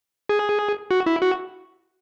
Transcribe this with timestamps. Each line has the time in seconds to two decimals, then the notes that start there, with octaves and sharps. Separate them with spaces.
0.29 G#4
0.91 F#4
1.06 E4
1.22 F#4